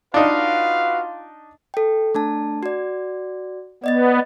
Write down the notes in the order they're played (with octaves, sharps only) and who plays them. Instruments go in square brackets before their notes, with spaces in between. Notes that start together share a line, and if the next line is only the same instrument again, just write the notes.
[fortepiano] D4 D#4 [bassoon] F4 [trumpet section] F#4 B4 F5
[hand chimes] A4 G5
A3 D4 A5
F#4 D5
[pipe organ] B3 [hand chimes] D5 D#5 A6